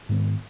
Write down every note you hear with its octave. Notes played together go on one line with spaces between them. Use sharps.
G#2 D#3 G#3 B3